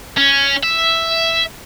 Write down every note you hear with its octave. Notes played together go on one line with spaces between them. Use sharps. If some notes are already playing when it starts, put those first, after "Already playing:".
C#4
E5